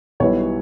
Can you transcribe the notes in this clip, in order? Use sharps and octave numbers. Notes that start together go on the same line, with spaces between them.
B1 B2 G3 B3 E4 C#5